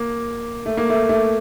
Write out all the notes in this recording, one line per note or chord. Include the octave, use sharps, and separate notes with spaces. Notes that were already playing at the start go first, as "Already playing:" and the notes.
Already playing: A#3
A3
A#3
A3
A3